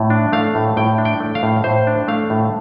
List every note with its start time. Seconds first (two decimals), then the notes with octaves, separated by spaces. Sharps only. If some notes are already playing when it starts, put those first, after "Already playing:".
Already playing: A2
0.10 D4
0.33 A3 F5
0.55 A2
0.77 A2 G5
0.98 D4
1.05 G5
1.20 A3
1.35 F5
1.43 A2
1.64 A2 C5
1.87 D4
2.08 A3 F5
2.30 A2